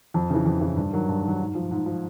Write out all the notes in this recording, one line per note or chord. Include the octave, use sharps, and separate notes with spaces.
F2
C#3 E3
F2
C#3 E3
G2
D#3 F#3
G2
D#3 F#3
G#2
F3
G#2
F3